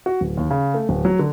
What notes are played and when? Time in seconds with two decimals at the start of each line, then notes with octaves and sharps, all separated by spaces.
0.06 F#4
0.21 D1
0.37 D#2
0.51 C#3
0.74 A3
0.89 D1
1.05 F#3
1.19 D3